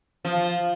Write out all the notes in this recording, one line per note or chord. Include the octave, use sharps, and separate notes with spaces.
F3